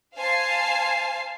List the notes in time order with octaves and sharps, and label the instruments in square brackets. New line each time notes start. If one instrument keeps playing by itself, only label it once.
[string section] C5 F5 G#5 A5 C7